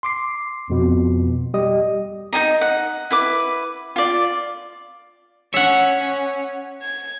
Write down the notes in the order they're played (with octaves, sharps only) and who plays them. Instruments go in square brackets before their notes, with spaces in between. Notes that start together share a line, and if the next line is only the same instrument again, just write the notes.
[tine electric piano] C6 D6 C7
F2 B2
G3 G4 D#5 D#6
[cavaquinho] D#4 G#4 D#5 A#5
F#5
E4 B4 D6
F4 D5
[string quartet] C#4 [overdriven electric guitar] C#5 [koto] E5 F#5
[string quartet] G#6